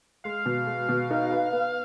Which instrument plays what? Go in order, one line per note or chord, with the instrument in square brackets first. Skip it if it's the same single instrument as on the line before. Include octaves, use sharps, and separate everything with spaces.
[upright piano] G#3 [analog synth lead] F5
[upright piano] B2
G#3
B2
D#4
B4
B3